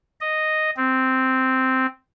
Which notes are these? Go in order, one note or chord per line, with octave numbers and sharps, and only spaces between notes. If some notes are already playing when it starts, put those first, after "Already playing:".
D#5
C4